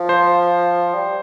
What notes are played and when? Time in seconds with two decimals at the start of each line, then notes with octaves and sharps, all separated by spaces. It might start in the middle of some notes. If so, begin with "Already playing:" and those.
Already playing: F3
0.09 C5
0.94 G3